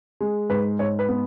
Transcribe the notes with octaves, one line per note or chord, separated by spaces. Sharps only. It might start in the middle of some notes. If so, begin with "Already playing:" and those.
G#3
G#2 B4
G#2 C#5
B4
B3